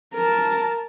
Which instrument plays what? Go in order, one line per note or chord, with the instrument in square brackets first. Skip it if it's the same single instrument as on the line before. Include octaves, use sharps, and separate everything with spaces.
[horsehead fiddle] A#4 A5